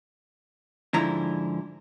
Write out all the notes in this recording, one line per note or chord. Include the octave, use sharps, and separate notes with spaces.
G#2 D3 F3 E4 A#5